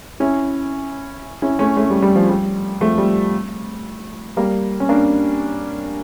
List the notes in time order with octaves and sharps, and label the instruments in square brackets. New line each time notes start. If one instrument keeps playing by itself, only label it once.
[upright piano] C#4 E4
C#4 E4
A3 C#4
A3 C#4
G3
G3
F3
G3
F3 A3
G3
G3 A#3
C#4
A#3 D4